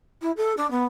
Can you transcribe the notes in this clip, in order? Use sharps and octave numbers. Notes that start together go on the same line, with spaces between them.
E4
A4
D4
B3